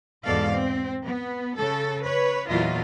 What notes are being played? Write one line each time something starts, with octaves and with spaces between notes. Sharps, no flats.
E2 G#2 B2 A4 D5 F5
C4
B3
C#3 A4
B4 C#5
E2 A#2 F#3 E4 F4 D#5